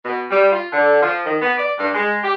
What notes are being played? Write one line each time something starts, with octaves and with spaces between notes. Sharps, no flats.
B2
G3
F4
D3
F3
D#3
B3
D5
G2
G#3
G4